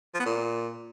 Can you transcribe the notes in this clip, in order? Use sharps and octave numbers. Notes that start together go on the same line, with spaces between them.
F3
B3
A#2